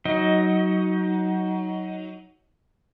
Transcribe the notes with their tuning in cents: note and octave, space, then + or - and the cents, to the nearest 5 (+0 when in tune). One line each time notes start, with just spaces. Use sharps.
F#3 +10 D#4 +20 D#5 +10